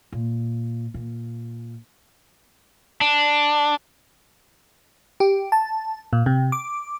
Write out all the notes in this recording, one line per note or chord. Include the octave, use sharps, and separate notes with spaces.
A#2
A#2
D4
G4
A5
A#2
C3
D6